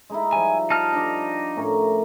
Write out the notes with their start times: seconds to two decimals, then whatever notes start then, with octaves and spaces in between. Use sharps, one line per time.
0.10 G#3 D#4 E4
0.33 F3 G3 G#5
0.70 D#4 A5 F6
0.93 D4 D5
1.57 A2 C#4 A#4